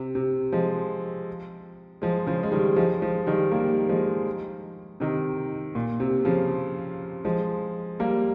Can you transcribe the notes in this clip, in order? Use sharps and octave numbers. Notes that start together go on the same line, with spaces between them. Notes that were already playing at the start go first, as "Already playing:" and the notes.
Already playing: C3
C3
F3 G#3
F3 G#3
C#3 F3
G#3
D#3 G3
F3 G#3
F3 G#3
D#3 G3
G3 A#3
F3 G#3
C3 D#3
A#2
C3
C#3 F3
F3 G#3
G3 A#3